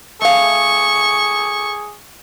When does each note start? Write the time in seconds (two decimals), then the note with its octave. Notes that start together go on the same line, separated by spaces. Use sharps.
0.22 A3 G#4 F5 C#6